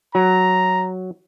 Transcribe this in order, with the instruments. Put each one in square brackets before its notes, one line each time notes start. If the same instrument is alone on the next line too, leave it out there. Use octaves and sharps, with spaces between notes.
[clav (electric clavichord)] F#3 [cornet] A#5